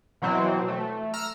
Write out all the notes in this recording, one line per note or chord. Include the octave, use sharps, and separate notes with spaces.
B2 E3 F#3 C4
A3
A#5 E6 F6